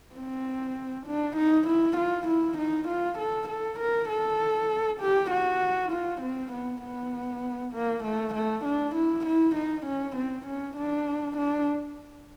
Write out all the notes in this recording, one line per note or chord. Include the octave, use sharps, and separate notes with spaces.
C4
D4
D#4
E4
F4
E4
D#4
F4
A4
A4
A#4
A4
G4
F#4
F4
C4
B3
B3
A#3
A3
A3
D4
E4
E4
D#4
C#4
C4
C#4
D4
D4